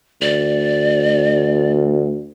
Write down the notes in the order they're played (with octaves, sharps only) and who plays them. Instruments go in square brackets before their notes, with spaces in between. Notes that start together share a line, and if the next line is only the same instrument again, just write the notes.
[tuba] D2 [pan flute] D5